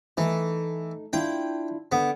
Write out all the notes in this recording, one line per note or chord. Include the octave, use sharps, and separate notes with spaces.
E3 A3 D#4
D4 E4 F4 G5
D3 B3